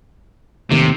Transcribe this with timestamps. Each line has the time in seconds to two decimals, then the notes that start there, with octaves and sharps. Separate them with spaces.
0.71 D#2 A2 C3 D#3